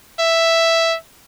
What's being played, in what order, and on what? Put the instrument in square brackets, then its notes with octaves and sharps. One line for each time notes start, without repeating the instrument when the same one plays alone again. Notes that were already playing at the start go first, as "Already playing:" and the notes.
[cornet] E5